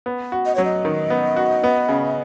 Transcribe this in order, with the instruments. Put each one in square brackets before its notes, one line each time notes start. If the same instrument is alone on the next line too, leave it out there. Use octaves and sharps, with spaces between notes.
[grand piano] B3
F#4
[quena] D#5
[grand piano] F#3 [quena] C#5
[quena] D#5
[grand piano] D#3
B3
F#4
B3
C#3